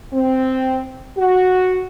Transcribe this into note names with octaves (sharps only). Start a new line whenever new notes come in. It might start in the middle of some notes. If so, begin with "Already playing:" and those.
C4
F#4